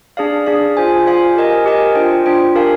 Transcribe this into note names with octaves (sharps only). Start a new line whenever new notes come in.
D4 G#4 D5 F5
D4 G#4 D5 F5
F4 C5 F5 G#5
F4 C5 F5 G#5
G4 A#4 D#5 G#5
G4 A#4 D#5 G#5
D4 F4 C5 G5
D4 F4 C5 G5
D4 G4 A#4 F5 G#5